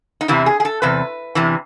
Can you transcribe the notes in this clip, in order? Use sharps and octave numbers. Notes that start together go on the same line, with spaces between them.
D#4
E2 C3 E3 E4
G#4
G#4
A4
E2 C3 B4
E2 C3 E3